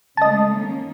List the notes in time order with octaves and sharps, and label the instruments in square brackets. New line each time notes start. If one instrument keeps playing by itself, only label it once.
[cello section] C#3 G#3 A3 [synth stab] D#5 A5
[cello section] D#3 A#3 C#4